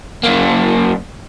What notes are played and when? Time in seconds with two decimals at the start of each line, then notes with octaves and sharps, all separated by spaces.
0.23 F#2 A#3